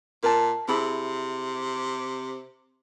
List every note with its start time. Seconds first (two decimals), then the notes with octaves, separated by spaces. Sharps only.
0.23 A#2 A#4 A5
0.68 C3 E4 G#4 B5